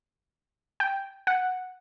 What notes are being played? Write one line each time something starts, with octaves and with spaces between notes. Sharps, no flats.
G5
F#5